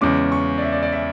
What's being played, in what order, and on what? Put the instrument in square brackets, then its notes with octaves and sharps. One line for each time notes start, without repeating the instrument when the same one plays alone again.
[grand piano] E2 C#3 G#3 C#4 D6
C#6
D5
E5
D5
D5
E5